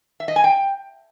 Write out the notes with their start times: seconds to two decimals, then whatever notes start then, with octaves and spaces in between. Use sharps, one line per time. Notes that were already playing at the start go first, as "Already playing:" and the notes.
0.20 E5
0.28 D#5
0.36 G#5
0.44 G5